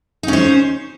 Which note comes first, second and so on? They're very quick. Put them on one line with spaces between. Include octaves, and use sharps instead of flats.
D#4 C#4 C5